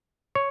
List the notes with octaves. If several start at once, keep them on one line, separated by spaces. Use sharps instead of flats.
C#5